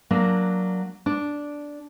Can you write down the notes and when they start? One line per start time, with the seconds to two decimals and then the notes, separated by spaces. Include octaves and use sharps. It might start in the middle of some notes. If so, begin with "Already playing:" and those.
0.11 F#3 A#3 D4
1.06 D4